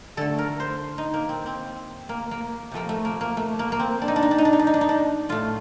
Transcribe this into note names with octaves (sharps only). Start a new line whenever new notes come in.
D3 A3 A4
A#4
C5
D#4
A#3
C4
C4
A#3
A#3
C3 F3 A3 A#3
A3
A#3
A#3
A3
A#3
A#3
C4
D4
D#4
D4
D#4
D4
D#4
D4
D#4
D4
D#4
D4
D#4
D4
A2 A3 F4